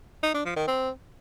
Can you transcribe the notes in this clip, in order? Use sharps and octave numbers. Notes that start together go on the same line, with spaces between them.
D#4
D4
F3
D#3
C4